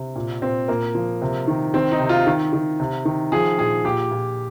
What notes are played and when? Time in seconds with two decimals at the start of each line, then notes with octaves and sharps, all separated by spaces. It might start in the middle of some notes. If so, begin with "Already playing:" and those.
Already playing: C3
0.16 A#2
0.42 A#2 C4
0.68 A#2 A#3
0.95 F3
1.22 C3
1.48 D#3
1.74 D#3 C4
1.92 D#4
2.00 C3
2.09 F4
2.27 D#3
2.53 D#3
2.80 C3
3.05 D#3
3.32 F3 G#4
3.58 A#2 G#4
3.85 A#2 G4
4.11 A#2